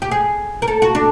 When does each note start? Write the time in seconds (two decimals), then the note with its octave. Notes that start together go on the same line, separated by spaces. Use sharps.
0.02 G4
0.11 G#4
0.62 A#4
0.68 A4
0.82 F#4
0.95 D4